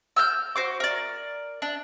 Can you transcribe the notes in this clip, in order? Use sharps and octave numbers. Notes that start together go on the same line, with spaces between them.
E6 F6 G6
F#4 C5 D6
A#4 D5
D4